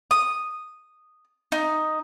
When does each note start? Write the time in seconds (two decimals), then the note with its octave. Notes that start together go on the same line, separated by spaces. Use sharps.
0.11 D#6
1.52 D#4